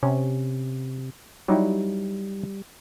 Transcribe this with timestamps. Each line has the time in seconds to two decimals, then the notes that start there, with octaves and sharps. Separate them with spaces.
0.03 C3 C#4
1.48 F#3 G3 D#4 E4